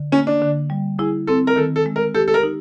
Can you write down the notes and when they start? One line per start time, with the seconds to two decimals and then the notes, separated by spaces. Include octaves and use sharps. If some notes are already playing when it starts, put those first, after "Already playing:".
Already playing: D3
0.12 A#3 C#4
0.27 D4
0.42 D3
0.70 G3
0.99 E4 G#4
1.27 C4 A4
1.47 A#4
1.56 D#3 A4
1.76 A4
1.86 G#3
1.96 A#4
2.14 G4 A4
2.28 A4
2.34 A#4
2.43 D#4